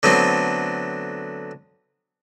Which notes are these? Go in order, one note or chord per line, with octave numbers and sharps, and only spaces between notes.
D3 F#3 A3 B3 C4